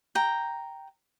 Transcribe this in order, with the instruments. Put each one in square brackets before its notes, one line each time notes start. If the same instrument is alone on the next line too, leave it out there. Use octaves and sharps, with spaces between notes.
[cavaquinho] G5 A#5